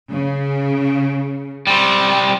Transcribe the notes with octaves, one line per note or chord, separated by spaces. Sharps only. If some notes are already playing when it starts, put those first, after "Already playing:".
C#3
G3 C4